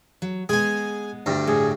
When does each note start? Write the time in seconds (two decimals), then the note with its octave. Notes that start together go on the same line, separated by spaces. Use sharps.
0.22 F#3
0.49 G#3 B3 G#4 G#5
1.26 D2 G2
1.47 A2 G#4